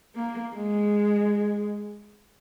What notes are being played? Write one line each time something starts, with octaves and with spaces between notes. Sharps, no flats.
A#3
G#3